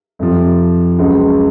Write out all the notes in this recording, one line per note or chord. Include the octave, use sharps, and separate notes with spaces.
F2 C3 F3
C#2 C#3 F#3